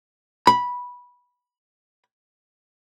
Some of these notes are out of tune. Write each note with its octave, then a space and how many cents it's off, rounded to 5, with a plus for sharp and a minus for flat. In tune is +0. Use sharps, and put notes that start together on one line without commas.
B5 -10